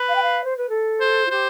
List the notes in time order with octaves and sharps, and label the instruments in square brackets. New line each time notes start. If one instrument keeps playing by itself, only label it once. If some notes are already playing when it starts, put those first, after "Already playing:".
Already playing: [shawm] B4
[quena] F5
G5
F5
C5
B4
A4
[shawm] C5
[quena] F4
[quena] G4 [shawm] C5